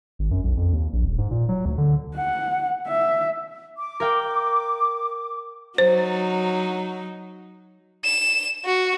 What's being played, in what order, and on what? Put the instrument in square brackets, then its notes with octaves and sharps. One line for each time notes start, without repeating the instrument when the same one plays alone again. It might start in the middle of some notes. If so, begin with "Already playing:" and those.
[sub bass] G#1
F#2
B1
F2
D#2
A#1
D#1
G#2
A#2
F#3
D2
D3
[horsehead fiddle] F#5
E5
[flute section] D6
[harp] A#4 F5 G5
[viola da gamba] F#3 D#4 [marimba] C5
[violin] E7
F#4